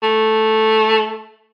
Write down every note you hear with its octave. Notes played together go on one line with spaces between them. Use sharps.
A3